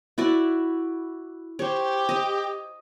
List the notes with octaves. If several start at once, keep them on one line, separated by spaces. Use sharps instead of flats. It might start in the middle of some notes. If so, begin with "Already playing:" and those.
E4 F#4 D5
G4 C5 C#5
D#5